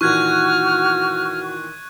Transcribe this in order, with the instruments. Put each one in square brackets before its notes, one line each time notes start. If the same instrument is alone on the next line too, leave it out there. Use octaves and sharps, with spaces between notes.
[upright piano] A#2 D#3 E3 [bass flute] F#4 [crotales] C#6 F#6 G#6 [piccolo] F6